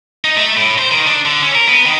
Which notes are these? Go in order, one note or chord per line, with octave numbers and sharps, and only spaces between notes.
D#4
A3
A2
C5
D#3
D4
D3
C#4
A#4
B3
D#3